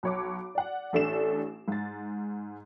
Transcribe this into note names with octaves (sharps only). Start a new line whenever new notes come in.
B1 C#5 D6
D5 F#5
A1 A3 D4 E7
G#2 A6